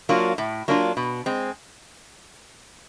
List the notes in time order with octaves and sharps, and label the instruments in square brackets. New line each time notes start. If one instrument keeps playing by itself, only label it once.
[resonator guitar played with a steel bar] F#3 A#3 D4 F4
A2
F#3 A#3 D4 F4
B2
G#3 C4